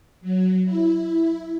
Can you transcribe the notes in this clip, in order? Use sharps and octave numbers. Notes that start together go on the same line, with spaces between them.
F#3
E4